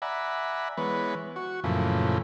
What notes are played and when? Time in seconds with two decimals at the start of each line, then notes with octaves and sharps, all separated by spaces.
0.02 D5 E5 F#5 G#5 A#5 B5
0.77 E3 G#3 B3 B4 C#5
1.36 F#4 C#6
1.64 F#2 A#2 C#3 E3 F3 A3